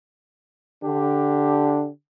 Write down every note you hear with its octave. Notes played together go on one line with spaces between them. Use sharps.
D3 D4 G4